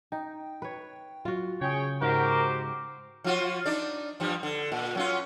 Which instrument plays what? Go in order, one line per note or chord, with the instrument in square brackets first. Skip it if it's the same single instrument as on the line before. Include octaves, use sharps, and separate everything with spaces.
[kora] D#4 [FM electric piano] G5
[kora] B4 C#5
[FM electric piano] F#3 [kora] F4 F#4
[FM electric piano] C#3 [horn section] G#4 C#5 G5
[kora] G#2 [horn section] F#4 G4 C5 [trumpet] A#4
[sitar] F3 F4 F#4
D4 D#4 D5
G2 F3 G3
D3
A#2
F#3 C#4 F4